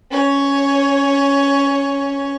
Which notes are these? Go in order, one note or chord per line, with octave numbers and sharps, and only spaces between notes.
C#4 C#5